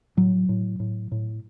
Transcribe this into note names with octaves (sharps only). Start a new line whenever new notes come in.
A2 F#3
A2
A2
A2